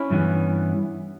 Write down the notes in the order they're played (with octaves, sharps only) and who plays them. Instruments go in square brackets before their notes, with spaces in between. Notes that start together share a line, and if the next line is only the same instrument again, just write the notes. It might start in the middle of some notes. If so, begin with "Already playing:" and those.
Already playing: [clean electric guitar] C#4 E4
G2 E3 G3 B3